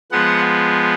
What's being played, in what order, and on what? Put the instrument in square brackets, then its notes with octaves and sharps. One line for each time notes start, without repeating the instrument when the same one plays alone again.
[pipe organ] F3 G#3 B3 F#5